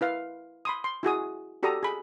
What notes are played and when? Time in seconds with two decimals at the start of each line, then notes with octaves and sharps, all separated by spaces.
0.01 E4 B4 F5
0.65 B5 C6 D#6
0.84 C6
1.03 E4 F#4 G#4 D#6
1.63 F#4 G4 A4 D5 A#5 D#6
1.83 G#4 B5